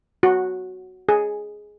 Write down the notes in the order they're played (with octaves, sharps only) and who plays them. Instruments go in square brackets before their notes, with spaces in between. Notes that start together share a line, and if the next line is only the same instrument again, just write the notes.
[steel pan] F#4
G#4